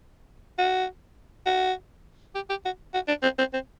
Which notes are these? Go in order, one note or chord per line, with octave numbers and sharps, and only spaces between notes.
F#4
F#4
G4
G4
F#4
F#4
D4
C4
C4
C4